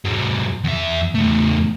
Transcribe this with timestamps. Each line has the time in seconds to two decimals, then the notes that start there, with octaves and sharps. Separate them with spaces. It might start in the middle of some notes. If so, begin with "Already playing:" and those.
0.05 G#2 F#3
0.64 E2 E5
1.15 E2 A3